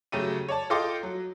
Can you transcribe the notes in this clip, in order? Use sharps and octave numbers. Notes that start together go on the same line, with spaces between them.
C#3 F#3 A3 G4 D#7
C#5 D5 A5
F4 A4 D#5 G5 C6 D6
F#3